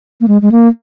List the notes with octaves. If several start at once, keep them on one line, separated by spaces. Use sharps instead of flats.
A#3
G#3
G#3
A#3